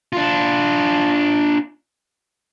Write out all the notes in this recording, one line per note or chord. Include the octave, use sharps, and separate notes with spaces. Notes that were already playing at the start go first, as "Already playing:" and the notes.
D4 F4